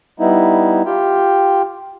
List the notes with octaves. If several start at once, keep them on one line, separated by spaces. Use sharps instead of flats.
G3 B3 D#4 E4
F4 G4 G5